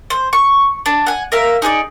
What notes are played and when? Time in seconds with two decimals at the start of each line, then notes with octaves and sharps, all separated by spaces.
0.10 C5
0.33 C#6
0.86 D4
1.07 F#5 G#5
1.32 A#4 E5 F5
1.62 D#4 G#4 B4 D5